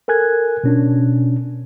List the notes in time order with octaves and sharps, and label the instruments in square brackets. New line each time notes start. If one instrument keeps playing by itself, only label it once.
[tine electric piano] A4 A#4 G#5 F#6 G#6
B2 C#4 D4